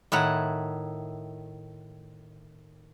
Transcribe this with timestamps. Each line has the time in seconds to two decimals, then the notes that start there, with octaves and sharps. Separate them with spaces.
0.12 A2 D#3 E4 F#5